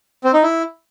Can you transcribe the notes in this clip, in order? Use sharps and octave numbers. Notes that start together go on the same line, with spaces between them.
C4
D#4
E4